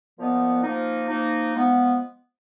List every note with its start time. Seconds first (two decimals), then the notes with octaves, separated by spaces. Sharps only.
0.17 A#2 F3 B3 D#4
0.62 F3 A#3 D#4
1.08 F3 A#3 D#4
1.53 F3 G#3 B3